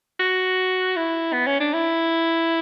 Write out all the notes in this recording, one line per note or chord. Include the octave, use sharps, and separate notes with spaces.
F#4
E4
B3
C#4
D4
E4